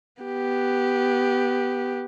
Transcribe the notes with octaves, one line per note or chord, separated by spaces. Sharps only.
B3 G4